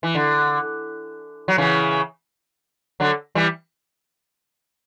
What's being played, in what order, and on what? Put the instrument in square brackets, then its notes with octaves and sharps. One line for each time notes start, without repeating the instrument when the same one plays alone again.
[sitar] E3
D3
F#3
C#3 E3
D3 F#3
E3 G3